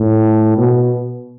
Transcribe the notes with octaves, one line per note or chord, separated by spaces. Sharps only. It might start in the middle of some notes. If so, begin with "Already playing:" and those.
Already playing: A2
B2